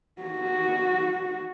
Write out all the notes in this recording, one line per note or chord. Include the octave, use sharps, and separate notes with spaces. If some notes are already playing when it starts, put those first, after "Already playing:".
F#4